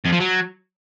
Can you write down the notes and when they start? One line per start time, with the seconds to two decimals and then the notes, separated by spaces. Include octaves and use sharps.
0.05 F2
0.13 F3
0.20 F#3